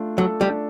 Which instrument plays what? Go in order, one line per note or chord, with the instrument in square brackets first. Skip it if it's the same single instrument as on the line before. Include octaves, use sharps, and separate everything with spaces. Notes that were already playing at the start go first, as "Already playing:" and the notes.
Already playing: [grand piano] A3 D4 F4
[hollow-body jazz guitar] F#3 [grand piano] A4
[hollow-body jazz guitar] G3
[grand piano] D4